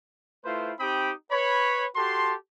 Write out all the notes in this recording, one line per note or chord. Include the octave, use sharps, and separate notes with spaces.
A3 E4 F4 B4 C5
C4 D#4 G4 G5 B5 D#6
B4 C#5 B5
F#4 G4 A4 A5 C6